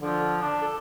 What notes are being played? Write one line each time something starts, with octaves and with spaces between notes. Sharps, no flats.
D3 F3
D4
A4